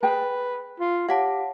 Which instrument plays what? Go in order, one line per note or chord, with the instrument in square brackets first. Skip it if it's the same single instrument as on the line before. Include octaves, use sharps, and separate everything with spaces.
[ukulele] G#4 G5 A5 [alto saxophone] B4
[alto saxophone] F4
[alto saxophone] G4 [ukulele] C#5 [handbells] F5 F#5 A5